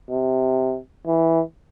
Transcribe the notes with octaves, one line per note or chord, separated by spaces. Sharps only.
C3
E3